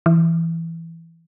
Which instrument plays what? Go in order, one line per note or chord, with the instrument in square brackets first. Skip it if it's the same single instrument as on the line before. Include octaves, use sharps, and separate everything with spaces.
[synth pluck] E3